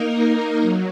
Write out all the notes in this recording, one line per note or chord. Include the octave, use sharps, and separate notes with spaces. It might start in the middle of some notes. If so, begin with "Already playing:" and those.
Already playing: A#3 D#4 A#4
F#3